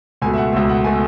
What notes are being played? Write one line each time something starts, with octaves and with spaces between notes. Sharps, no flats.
C#2 B2 A3 G#5
E5
F#5
C#2 B2 A3 E5
F#5
B2 A3 G#5